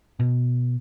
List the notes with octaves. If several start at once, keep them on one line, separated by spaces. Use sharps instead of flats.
B2